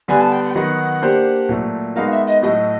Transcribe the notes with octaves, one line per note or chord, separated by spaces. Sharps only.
D3 G3 B3 G#5
A5
G5
F#5
G5
D#3 F#3 B3 D#4 F#5
A#3 D4 G4 C5
A#2 F#3 A3
G#3 B3 D#4 F#4 A#4 F5
E5
D#5
A2 F#3 A3 D#5